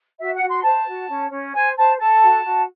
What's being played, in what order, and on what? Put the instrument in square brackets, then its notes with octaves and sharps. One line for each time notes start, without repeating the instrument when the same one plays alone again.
[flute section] F#4 E5
F#5
F#4
C6
C5 A5
F#4
C#4
C#4
C5 G#5
C5 A5
A4 A5
F#4
F#4